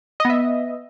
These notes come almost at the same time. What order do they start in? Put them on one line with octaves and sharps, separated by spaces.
D#5 B3 E5